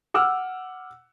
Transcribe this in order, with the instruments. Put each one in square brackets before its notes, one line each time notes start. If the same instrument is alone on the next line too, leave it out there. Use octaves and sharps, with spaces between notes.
[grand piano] F#5 D6 E6 F6